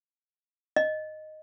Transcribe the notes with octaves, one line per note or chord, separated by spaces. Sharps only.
D#5